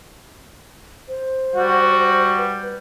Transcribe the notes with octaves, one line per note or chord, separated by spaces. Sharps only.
C5
G3 F#4
B4